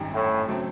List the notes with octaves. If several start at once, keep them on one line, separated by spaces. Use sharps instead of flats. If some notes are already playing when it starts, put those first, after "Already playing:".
Already playing: G#1 F#2 D#3 G3
A2
C#3 F#3 A3 C4